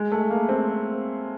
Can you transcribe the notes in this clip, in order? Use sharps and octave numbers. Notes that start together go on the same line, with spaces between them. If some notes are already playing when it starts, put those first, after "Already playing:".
Already playing: G#3
A3
A#3
C4